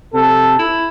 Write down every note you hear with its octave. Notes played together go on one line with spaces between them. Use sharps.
C3 A4
E4